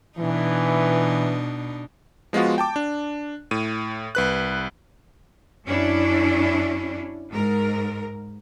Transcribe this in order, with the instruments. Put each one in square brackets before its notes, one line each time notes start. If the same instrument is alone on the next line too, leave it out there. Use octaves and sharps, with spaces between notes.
[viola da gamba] B2 D4 D#4 [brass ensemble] E3
[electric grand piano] F3 G#3 B3 F4 F#4
G5 A5 D6
D4
A2 D#7
C2 B4 F#6
[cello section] F#2 C#4 D4 E4
G#2 A#4